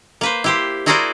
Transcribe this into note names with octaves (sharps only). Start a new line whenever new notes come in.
A#3 B4 C5
E4 G4 C5
E4 F#4 G#4 A#4 C5 D5